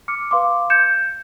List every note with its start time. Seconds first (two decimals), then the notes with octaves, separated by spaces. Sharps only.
0.08 D6 F6 C#7
0.31 B4 F5 C6 D6
0.70 G6 G#6 C#7 E7